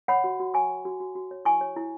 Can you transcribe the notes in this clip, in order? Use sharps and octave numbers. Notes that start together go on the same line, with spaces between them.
C#5 F#5 B5
F#4
F#4
C#5 G#5 C#6
C#5
F#4
F#4
F#4
C#5
E4 G#5 C#6
C#5
E4